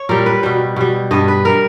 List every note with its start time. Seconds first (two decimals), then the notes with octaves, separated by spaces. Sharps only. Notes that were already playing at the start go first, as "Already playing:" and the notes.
Already playing: C#5
0.09 A#2 G3 A#4
0.26 B4
0.43 B2 G3
0.76 B2 G3
1.11 G2 G3 D#5
1.28 B4
1.45 G3 A#4